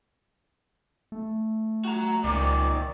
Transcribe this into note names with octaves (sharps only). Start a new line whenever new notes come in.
A3
F#4 A#5
C#2 A#2 D#3 D5